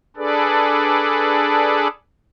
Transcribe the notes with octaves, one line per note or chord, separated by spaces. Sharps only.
D4 G#4 A4 B4 D5